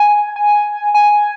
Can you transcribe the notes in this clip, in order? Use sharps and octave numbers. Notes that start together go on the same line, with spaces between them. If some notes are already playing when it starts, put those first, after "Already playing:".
Already playing: G#5
G#5
G#5